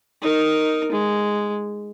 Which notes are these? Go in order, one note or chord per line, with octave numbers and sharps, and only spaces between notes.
D#4 A#4
G#3